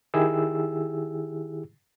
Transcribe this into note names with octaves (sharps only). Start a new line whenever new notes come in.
D#3 E4 G4 G#4 E6